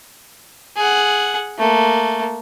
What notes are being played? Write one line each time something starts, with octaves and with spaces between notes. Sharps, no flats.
G#4 F#5
A3 A#3